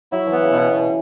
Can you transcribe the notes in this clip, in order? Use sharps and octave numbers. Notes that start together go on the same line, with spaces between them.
F#3 E4
E3
B3
C#3
B2
E3
B2